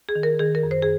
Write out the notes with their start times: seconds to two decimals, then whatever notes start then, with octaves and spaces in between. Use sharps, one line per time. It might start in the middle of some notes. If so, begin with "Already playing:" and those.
0.09 G#4
0.15 D#3
0.23 A#4
0.39 D#3 G#4
0.55 A#4
0.63 F#2
0.71 C5
0.82 G#4